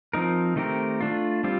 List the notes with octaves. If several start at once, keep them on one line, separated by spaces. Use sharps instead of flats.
F3 C4 D#4 A#4
D#3 A3 C4 G4 A#4
A3 D4 F4
G3 C4 F4